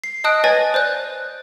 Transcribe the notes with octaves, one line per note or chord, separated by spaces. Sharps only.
C7
D#5 A5 D#6 F#6 D7
B4 C#5 D#5 G#5 A6 A#6
C5 D5 F#6